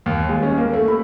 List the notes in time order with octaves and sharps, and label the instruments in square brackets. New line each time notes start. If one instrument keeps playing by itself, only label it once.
[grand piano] D#2
G#3
C#4
A#3
A3
B5